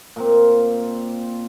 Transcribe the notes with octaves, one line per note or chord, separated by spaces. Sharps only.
A#2 A#3 C4